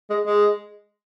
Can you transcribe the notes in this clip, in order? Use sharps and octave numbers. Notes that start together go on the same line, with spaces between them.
G#3
G#3